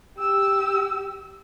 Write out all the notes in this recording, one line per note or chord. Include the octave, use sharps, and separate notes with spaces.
G4 E6